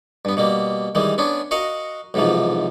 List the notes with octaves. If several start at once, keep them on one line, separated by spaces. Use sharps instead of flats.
G2 B3
B2 G3 A#3
D#3 E3 G3 G#3
B3 C#4 D4
F#4 A#4 D#5 F5 F#5
B1 G#2 C3 E3 F3